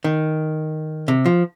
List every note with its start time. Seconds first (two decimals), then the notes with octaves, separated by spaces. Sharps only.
0.04 D#3
1.08 C3
1.26 F3